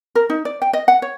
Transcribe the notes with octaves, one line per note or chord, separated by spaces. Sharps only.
A#4
D#4
D5
G5
D#5
F#5
C#5